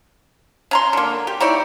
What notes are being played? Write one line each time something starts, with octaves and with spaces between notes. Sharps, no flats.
C#4 A#5 C6
D3 A#3
G4
D#4 E4 C#5 D5